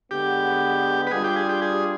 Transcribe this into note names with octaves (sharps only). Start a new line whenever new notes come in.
D3 G#3 B3 G4
B4
G3 D4 F4 G#4
G4
G#4
G4
G#4